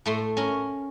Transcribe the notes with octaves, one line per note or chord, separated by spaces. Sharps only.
A2 A3 C6
C#4 A#4